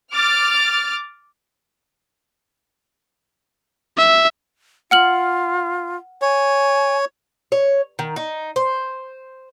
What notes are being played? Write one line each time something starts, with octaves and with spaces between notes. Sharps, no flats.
D6 F6 A6
E5
F4 F#5 F6 F#7
C#5 G#5
C#5
D#3
D#4
C5